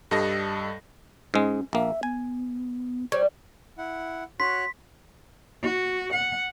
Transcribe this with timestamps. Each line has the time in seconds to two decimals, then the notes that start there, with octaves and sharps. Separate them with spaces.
0.11 G2 G3 A4 D#5 A#6
1.34 G#2 G#3 C#4
1.73 A#1 A#3 E5
2.03 B3 G#5
3.12 G3 C5 C#5
3.78 E4 F#5
4.40 F#4 C#5 C6 F#6 B6
5.63 F#4
6.13 F#5